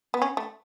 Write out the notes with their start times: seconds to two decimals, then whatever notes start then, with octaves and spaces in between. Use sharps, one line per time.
0.14 B3
0.22 C#4
0.37 A3